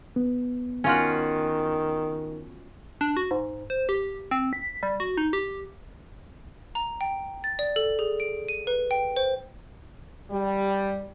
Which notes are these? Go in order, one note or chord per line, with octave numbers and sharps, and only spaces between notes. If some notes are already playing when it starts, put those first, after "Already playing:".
B3
D#3 C#4 F4 F#4
D4
F#4
G#2
C5
G4
C4
B6
G3
F#4
D#4
G4
A#5
G5
A6
D5
A4
G#4
D7
D#7
B4
G5
C5
G3